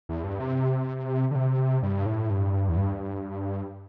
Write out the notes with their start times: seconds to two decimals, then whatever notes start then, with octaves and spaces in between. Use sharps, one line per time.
0.09 E2
0.24 G2
0.40 C3
1.31 D3
1.35 C3
1.83 G2
2.06 A2
2.30 G2
2.69 E2
2.77 G2